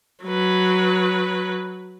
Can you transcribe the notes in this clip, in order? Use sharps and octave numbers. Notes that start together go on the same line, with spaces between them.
F#3 B4